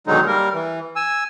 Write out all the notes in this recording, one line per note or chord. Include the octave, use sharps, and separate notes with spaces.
B2 D3 D#3 F#3 G#3 D#4
G3 A#3 A#4
E3
G#5 E6